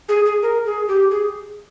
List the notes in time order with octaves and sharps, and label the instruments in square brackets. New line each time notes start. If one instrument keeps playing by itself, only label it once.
[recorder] G#4
G#4
A#4
G#4
G4
G#4